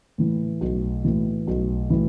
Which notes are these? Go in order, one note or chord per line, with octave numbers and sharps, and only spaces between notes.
A2 E3
B1
A2 E3
B1
A2 E3